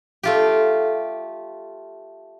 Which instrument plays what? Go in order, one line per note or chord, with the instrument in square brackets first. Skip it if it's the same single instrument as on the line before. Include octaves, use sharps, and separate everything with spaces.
[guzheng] A3 F4 G4